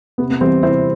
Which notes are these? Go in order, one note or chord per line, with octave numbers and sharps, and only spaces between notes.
C3 B3
B3
E3 G3 C4
C3 C4 E4